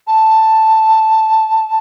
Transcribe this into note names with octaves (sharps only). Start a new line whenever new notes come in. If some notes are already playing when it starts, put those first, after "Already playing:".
A5